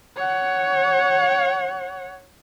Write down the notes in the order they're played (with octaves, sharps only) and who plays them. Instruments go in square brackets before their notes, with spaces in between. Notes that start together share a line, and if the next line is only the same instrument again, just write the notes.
[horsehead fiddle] C#5 F#5